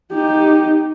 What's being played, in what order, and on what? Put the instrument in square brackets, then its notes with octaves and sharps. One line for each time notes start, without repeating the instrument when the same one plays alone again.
[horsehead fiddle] D#4 G4